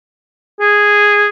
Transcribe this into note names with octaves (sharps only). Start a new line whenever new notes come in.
G#4